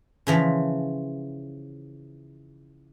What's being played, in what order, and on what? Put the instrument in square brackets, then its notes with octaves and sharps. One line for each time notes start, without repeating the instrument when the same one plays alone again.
[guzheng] C#3 E3 F3